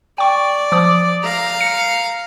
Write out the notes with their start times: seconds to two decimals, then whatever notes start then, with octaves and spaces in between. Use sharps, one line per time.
0.18 D5 G5 C#6
0.72 F3 D6 D#6
1.23 F5 A#5
1.61 C#7